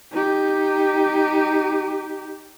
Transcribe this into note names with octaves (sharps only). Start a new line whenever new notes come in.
D#4 G4